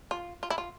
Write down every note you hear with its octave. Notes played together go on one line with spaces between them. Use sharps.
F4
F4
E4
F4